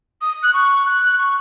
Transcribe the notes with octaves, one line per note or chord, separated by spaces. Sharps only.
D#6
F#6
C#6
F#6
C#6